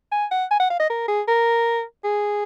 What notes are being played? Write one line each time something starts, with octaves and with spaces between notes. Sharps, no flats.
G#5
F#5
G#5
F#5
F5
D#5
A#4
G#4
A#4
G#4